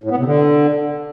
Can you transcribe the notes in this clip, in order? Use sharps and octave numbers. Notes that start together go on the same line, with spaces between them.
A2
B3
C3
D3